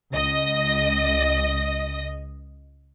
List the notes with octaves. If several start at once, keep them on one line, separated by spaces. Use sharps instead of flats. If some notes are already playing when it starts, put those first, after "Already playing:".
C#2 D#5 A#6